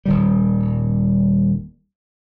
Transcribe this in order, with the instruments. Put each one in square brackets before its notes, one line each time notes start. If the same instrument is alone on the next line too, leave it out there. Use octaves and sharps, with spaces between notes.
[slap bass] D#1 D#3 G3